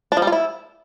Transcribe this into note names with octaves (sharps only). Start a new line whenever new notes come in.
D4
F3
G3
F4
E4